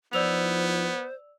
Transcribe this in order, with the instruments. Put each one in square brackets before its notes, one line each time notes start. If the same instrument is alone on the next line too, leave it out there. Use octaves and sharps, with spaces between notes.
[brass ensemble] F3 D#4 E4 [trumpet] B3 [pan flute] C5 [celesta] D5 E6 F7